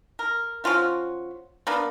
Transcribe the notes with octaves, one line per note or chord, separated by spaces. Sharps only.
A#4
F3 C#4 F4 F#4
A#3 B3 D4